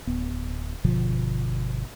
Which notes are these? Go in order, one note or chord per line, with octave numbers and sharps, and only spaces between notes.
D1 B3
G1 B2 D3 F3